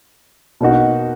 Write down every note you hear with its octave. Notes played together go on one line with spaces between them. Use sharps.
B2 A#3 D#4 F#4